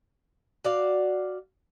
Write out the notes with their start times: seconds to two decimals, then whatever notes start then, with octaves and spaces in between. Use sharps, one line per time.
0.64 F#4 D5 F5